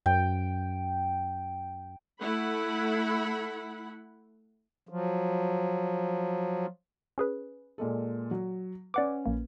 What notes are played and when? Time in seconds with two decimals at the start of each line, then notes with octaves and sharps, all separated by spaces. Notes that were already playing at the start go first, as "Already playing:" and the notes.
0.06 F#2 G5
2.20 A3 E4 F#5 B5
4.89 F3 F#3
7.18 C#4 G#4 B4
7.78 A#2 G#3 A4
8.31 F#3
8.94 C#4 B4 D5 F#5 D6
9.26 A#1 A#3